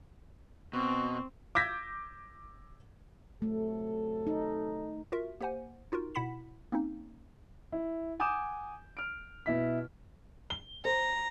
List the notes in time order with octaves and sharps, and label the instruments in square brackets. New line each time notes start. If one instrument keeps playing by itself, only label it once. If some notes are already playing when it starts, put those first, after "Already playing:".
[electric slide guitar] B2 [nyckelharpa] C4 [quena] C#6
[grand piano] D6 E6 G6 G#6 A#6 B6
[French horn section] C3 F#3 A4 [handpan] A3
[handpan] D#4
[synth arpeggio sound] F4 F#4 A#4 E5
A#3 G4 C5 F#5 G#5
D#4 F4 F#4 A#4
B2 E4 F#5 B5 B6 E7
A#3 C4 C#4 D#4
[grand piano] E4
F#5 G#5 D6 D#6 G6 E7
F6 D7
B2 E4 B6
[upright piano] G7
[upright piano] C5 [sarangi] A#5